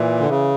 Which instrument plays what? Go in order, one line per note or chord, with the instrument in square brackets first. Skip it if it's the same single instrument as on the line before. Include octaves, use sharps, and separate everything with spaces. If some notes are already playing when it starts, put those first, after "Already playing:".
Already playing: [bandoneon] A#2 [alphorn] E3
[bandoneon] D3
C#3